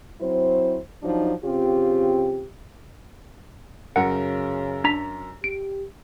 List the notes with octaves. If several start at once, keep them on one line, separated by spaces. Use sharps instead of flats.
F#3 C4 E4 C5
F3 F#3 D4 D#4
C#3 C4 F4 G4
F#2 C#3 A#4 F#5
D4 A#5 B6
G4 D7